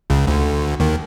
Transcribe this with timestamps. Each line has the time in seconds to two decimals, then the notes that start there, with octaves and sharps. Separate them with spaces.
0.10 C#2 C#3
0.27 D2 D3
0.80 D#2 D#3